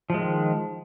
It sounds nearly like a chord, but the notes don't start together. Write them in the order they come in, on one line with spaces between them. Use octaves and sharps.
F3 G#3 D#3